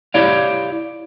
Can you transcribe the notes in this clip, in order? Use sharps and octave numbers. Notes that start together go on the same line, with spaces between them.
E4 G4 C#5 D5 F5